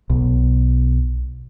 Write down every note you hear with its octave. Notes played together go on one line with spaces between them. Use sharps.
B1